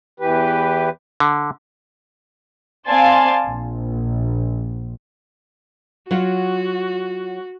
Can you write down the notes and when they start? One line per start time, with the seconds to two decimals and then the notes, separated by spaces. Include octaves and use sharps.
0.20 E2 E3 G4 B4
1.20 D3
2.88 C4 D5 F5 G#5 A5 C6
3.47 A#1
6.11 F#3 F4 F#4 C#5